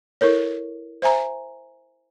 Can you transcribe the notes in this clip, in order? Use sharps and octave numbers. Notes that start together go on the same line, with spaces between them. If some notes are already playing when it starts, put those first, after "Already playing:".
E4 A4 A#4 C#5
C5 E5 G#5 A#5